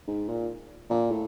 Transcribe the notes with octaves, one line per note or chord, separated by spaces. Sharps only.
G#2
A#2
A#2
A2